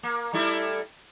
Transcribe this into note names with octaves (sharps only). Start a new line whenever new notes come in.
A#3
G3 A3 E4